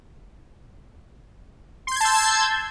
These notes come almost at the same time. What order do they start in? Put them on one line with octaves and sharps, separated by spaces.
C6 G6 G#6 A5 E6